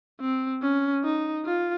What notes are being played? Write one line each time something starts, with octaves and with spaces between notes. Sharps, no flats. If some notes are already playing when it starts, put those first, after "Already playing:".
C4
C#4
D#4
F4